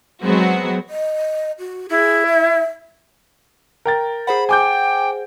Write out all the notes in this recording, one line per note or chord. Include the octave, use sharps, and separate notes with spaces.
F#3 G#3 B3 C4 F#4
D#5
F#4
E4 G#4
E5
A#4 G5 A6
G#4 C5 F#5 B5
G5 G#5 D6 G6